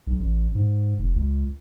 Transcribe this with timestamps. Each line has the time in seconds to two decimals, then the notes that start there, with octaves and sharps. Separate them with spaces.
0.07 B1
0.20 A1
0.55 G#2
0.99 F1
1.16 C#2